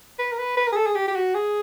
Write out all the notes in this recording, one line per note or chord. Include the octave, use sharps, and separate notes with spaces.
B4
A#4
B4
B4
A#4
G#4
A4
G#4
G4
G4
F#4
G#4